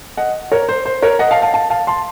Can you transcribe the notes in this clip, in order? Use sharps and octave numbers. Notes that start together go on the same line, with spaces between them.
D#5 F#5
A#4 C#5
C5
C5
A#4 C#5
D#5 F#5
F5 A5
F5 A5
F5 A5
F5 A5
A5 C6